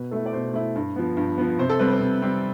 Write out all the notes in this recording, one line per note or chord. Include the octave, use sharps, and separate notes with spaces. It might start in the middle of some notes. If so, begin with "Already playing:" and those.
Already playing: B2 B4
A3 E4 A4
D5
B2 C5
A3 E4
G2
F3 B3
G2
F3 B3
C3 C5
A4
G3 C4 B4
C5
C3
G3 C4